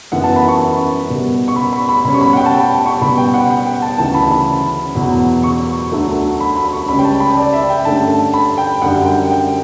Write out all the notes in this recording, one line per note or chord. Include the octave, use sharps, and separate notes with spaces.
F#2 E3 B3 F#5
A5
B5
C#6
B2 G3 B3
C#6
B5
B5
B5
B2 G3 C#4 B5
C#6
B5
F#5
G5
A5
G5
C#6
B2 G3 B3 B5
G5
F#5
F#5
G5
A5
D2 C#3 E3 A5
B5
B5
E2 B2 F#3
C#6
D2 D3 F#3 A3
B5
B5
C#6
C#2 C#3 G3 C#4 B5
G5
A5
B5
D5
E5
G5
G2 D3 A3 C#4 A5
B5
G5
F#2 D3 G3 F#5
G5
G5